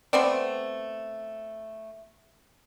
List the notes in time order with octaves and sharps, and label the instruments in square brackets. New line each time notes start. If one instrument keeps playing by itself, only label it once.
[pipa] A3 B3 C4 D5